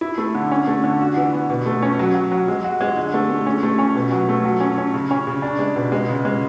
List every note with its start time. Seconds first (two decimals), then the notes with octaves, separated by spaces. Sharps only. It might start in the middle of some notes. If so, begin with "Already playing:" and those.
0.01 E4
0.18 A3
0.35 D3
0.51 C#4
0.67 A3
0.84 D3
1.01 F#4
1.17 E3
1.33 B3
1.50 B2
1.66 A3
1.82 C#4
1.99 F#3
2.14 F#3
2.31 F#3
2.48 G#3
2.64 F#4
2.81 G#3
2.96 D3
3.14 A3
3.30 A3
3.46 C#4
3.63 A3
3.78 C#4
3.95 B2
4.12 F#3
4.29 A3
4.45 F#3
4.60 C#4
4.78 C#4
4.94 C#3
5.11 C#4
5.27 C#3
5.42 D4
5.59 G#3
5.76 B2
5.92 G#3
6.09 C#3
6.25 G#3